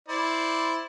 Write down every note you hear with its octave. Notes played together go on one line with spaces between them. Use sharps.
E4 C5 D5